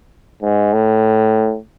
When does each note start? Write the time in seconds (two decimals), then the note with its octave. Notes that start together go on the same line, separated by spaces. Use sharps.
0.42 G#2
0.73 A2